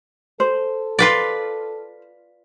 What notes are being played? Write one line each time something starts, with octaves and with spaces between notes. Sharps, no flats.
A4 C5
F4 B4 D5